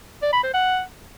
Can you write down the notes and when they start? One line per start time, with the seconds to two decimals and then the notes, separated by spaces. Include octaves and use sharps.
0.22 D5
0.33 B5
0.43 C5
0.54 F#5